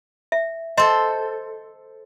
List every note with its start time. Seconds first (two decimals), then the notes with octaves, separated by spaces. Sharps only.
0.32 E5
0.77 A4 C5 D#5 C6